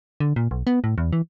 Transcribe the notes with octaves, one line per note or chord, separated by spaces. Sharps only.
D3
A#2
B1
B3
A2
E2
E3